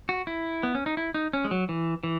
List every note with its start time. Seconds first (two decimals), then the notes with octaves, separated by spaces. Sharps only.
0.09 F#4
0.27 E4
0.63 B3
0.75 C#4
0.86 D#4
0.97 E4
1.14 D#4
1.33 C#4
1.45 G#3
1.51 F#3
1.69 E3
2.03 E3